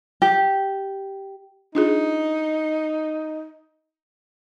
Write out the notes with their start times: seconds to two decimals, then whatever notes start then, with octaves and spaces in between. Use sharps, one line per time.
0.22 G4
1.75 D4 D#4 F4 G#4